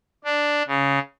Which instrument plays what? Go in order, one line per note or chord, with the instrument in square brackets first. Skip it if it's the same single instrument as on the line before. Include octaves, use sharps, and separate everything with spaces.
[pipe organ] D4
C#3